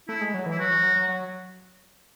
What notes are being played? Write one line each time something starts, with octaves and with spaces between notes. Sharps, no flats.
A3 E4
G#3
F#3
E3
E4
F#3 F#4
E3
F#3
F#3
F#3